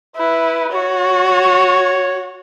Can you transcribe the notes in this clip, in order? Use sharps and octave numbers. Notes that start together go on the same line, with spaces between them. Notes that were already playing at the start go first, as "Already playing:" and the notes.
E4 B4
F#4 C#5
C#5